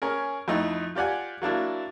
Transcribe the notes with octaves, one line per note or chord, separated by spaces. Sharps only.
C#4 G#4 A#4
F2 A3 D#4 E4
F4 G4 D5 F#5 G#5
F#3 A#3 D4 E4